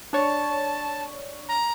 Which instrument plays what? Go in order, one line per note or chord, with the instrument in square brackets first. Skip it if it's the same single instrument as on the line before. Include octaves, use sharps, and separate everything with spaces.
[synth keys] D4 C#5 [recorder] A5
[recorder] A#5